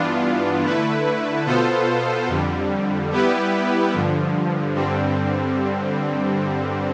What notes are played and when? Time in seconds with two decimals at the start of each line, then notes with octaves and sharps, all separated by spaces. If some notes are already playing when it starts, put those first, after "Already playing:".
Already playing: G2 E3 B3 D4 F4
0.63 D3 A3 E4 B4
1.45 B2 B3 F4 A4 C5
2.28 F2 D3 G3
3.11 G3 B3 E4 G4 B4
3.93 G2 D3 F3
4.75 G2 D3 G3 C4